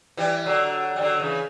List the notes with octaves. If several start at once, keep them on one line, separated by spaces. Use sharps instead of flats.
E3 G3
D3 F#3
G3
D3 F#3
C#3 E3